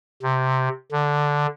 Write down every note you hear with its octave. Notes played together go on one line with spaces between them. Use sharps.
C3
D3